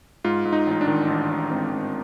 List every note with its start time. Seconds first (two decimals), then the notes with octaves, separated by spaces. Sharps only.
0.24 G#2 F4
0.45 G#2
0.53 D#4
0.67 A1 D#4
0.81 D4
0.87 D#3
1.08 A1 D4
1.29 A1
1.50 G#2 C4
1.71 A1